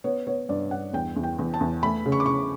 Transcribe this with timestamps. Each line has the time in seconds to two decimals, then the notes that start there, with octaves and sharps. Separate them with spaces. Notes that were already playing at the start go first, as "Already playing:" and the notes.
0.04 B3 C#5
0.27 B3 C#5
0.49 G2 D5
0.71 G2 F#5
0.93 E2 G5
1.16 E2
1.23 G5
1.39 E2
1.54 A5
1.61 E2
1.83 A3 B5
2.06 C#3
2.12 C#6
2.20 D6
2.26 C#3 C#6